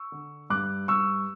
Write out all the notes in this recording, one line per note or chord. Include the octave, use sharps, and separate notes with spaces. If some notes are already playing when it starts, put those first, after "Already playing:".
Already playing: C#6 E6
D3
G2 D6 F#6
G2 C#6 E6